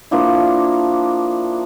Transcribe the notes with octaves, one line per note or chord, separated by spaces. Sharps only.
F3 A#3 D4 E4